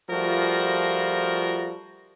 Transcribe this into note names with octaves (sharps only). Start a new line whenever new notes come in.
F3 G3 A3 F4 F#4 A#4